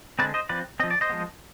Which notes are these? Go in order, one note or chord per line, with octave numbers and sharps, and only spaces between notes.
D3 G#3 C4 B4 D5
C5 D#5
F3 C4 B4 D5
F3 C4 D#5
D5
C5 D#5
F3 G#3 B3